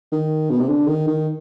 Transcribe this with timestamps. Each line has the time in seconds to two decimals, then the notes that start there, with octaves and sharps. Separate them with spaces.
0.12 D#3
0.50 B2
0.60 C3
0.69 D3
0.88 D#3
1.07 D#3